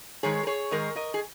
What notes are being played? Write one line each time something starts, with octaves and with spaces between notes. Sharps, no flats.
G#2 D#3 G#3 G#4 C#5
A#4
G#4 C#5
G#2 D#3 G#3 A#4 D#5
A#4 D#5
G#4